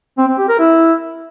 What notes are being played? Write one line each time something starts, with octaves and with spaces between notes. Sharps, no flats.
C4
C4
G4
A#4
E4